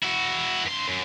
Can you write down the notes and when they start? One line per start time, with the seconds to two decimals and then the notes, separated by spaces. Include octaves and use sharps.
0.03 E4 F#4
0.66 G2 C6
0.88 F#2